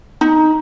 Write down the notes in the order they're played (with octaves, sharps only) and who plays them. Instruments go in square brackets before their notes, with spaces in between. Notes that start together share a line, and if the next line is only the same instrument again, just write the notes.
[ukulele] D#4